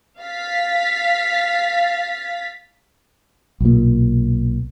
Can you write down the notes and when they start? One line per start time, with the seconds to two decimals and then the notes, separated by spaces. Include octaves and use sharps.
0.21 F5 A6 B6
3.60 B1 A#2